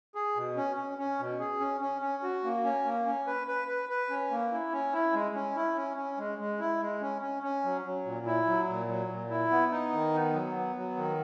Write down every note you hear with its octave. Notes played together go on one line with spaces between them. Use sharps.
G#4
B2
C#4
C#4
C#4
B2
G#4
C#4
C#4
C#4
F#4
A#3
C#4
A#3
C#4
B4
B4
B4
B4
C#4
A#3
E4
C#4
E4
G#3
C#4
E4
C#4
C#4
G#3
G#3
E4
G#3
C#4
C#4
C#4
F#3
F#3
A#2
E4
F#3
A#2
F#3
A#2
E4
B3
D#4
D#3
B3
F#3
B3
F#3
D#3